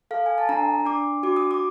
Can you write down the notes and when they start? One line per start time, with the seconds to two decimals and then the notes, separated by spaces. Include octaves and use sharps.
0.11 A4 F5
0.26 G#5
0.38 A5
0.49 D4 A#5
0.86 D4 D6
1.23 F#4 D6
1.36 D#6
1.51 D6